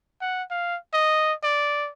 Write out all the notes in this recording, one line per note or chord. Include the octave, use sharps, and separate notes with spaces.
F#5
F5
D#5
D5